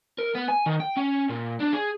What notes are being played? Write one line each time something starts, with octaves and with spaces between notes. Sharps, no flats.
A#4
B3
G#5
D#3
G5
C#4
A#2
D4
G#4